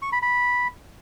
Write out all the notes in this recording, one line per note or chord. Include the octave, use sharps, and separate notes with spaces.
C#6
B5
B5